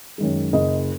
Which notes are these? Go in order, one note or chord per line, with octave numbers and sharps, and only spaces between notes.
F#2 D#3 G#3
F#1 D#5